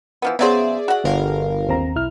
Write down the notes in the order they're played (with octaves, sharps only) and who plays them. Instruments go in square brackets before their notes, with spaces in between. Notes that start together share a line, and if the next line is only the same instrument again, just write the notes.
[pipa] E3 F3 B3
[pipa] C#3 F#3 C5 [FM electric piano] B3 [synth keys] G#4 D5 E5
[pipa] F#4 F#5
[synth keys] G1 A#4 F5 [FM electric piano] D3
[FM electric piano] D#2 C4 A#5
B1 E4 F6